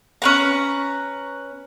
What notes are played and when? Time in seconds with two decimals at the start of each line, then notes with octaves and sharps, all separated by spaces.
0.22 C#4 B4 A#5